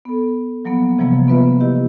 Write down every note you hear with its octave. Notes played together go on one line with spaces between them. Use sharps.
B3 A4
F3 F#3 A#3 B3
C3 E3 F3 G3 A#3 B3
A#3 B3 F4 B4 E5
E4 G4 D#5